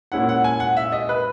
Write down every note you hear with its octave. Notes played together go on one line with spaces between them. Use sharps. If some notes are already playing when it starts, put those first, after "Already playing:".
A#2 G#3 C#4 E4 F#5
F#5
G#5
F#5
E5
D#5
B4